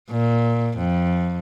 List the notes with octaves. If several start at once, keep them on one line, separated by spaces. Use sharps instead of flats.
A#2
F2